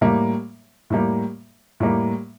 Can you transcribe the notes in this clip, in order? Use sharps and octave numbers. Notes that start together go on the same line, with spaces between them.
A2 G3 A#3
A2 G3 A#3
A2 G3 A#3